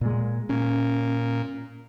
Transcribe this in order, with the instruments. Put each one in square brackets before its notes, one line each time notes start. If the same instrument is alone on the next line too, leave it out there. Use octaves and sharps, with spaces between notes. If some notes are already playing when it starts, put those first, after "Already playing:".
[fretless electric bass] A#2 G#3
[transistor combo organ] A#2 [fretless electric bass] C#4